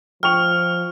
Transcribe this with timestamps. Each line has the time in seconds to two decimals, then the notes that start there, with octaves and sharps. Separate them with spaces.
0.23 F3 G5 C#6 F6 F7